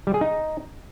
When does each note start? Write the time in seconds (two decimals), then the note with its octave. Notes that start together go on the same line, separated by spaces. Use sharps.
0.07 G3
0.14 G#4
0.21 D#4